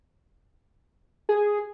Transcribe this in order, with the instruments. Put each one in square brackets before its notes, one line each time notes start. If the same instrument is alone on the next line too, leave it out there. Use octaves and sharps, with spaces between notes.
[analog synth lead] G#4